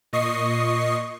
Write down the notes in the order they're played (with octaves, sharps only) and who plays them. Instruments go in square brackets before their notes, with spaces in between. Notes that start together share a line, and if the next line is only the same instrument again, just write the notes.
[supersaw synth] A#2 D#5 C#6 D#6 C7